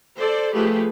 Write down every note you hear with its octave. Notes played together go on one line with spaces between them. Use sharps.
A4 C5 D5
F3 A3 G4 G#4 B4